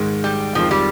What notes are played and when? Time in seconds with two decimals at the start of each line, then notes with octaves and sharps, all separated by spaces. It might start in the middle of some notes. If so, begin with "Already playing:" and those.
Already playing: G#2 D#3 G#3
0.24 G3
0.55 F2 D#3 F3 G#3 C4 F4
0.71 G3